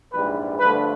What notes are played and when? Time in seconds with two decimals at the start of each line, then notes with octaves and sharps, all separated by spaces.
0.13 A#1 G#2 E3 G3 B4
0.59 G2 D3 F3 A3 B4